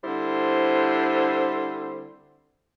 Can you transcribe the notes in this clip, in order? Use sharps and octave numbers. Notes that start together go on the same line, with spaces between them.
D3 G3 C4 E4 C5